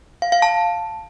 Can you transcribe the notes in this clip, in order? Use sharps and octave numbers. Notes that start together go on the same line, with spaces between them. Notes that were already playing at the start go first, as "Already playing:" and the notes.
F5
F5
A5